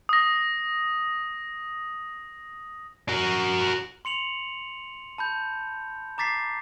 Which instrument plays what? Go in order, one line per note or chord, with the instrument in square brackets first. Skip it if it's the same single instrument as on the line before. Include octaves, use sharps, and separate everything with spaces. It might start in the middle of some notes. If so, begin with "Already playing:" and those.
[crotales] D#6 A#6
[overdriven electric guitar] F#4 A#4
[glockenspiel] C6 C#7 F7 F#7
A5 B5 G6
A#5 D6 A6 B6 C7